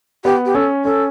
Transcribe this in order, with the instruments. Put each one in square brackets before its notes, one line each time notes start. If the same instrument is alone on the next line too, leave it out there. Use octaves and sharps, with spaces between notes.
[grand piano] B3 [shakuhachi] G4
[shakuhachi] G4
[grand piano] C#4 [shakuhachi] A4
[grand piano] C#4 [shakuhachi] A4